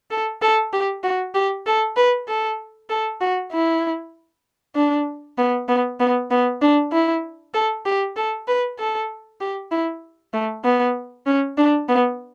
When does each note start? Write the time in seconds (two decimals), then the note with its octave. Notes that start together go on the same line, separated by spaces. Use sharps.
0.11 A4
0.42 A4
0.73 G4
1.03 F#4
1.35 G4
1.66 A4
1.97 B4
2.28 A4
2.90 A4
3.21 F#4
3.52 E4
4.75 D4
5.38 B3
5.68 B3
6.00 B3
6.31 B3
6.62 D4
6.92 E4
7.54 A4
7.86 G4
8.16 A4
8.48 B4
8.79 A4
9.41 G4
9.71 E4
10.34 A3
10.64 B3
11.27 C#4
11.58 D4
11.89 B3